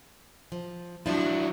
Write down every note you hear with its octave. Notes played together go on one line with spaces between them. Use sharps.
F3
F3 F#3 D4 E4